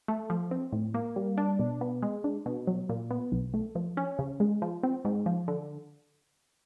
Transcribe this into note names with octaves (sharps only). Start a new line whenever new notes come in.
A3
F3
C4
A2
A#3
G3
D4
B2
B3
G#3
D4
B2
F#3
A#2
B3
B1
A3
F3
C#4
C#3
G#3
F3
C4
G#2
F3
D3